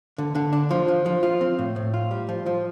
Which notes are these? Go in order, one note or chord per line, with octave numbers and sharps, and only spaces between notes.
D3
D3
D4
F3
F3
F3
F4
C4
A2
A2
F4
G3
F3
F3